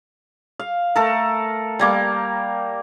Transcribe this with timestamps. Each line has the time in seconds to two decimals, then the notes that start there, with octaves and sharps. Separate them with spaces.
0.59 F5
0.96 A3 A4 A#4
1.79 G3 A#3 D6